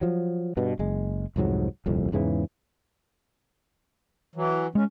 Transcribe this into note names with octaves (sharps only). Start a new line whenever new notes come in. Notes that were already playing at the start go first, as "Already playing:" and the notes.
F3 F#3
G2 B2
F#1 G#3
C2 F2 G#2 F#3
D#1 C2 F2
E2 G#2 C#3 E3
E3 F#3
G#3 C#4